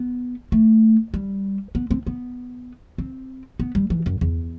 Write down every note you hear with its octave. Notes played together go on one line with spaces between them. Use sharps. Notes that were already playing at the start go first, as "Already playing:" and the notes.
Already playing: B3
A3
G3
B3
C4
B3
C4
B3
G3
E3
F#2
E2